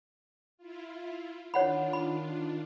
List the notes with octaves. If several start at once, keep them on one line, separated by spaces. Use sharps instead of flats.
E4 F4
D#3 D4 F4 C#5 F#5 B5
B5